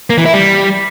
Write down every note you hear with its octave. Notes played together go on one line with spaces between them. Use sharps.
A#3
E3
E4
G3